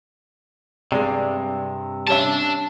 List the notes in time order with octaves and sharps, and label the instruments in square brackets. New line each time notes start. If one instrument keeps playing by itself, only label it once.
[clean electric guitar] G2 C3 [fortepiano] G#3 D5
[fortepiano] G3 C#4 E5 [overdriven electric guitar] D4 A5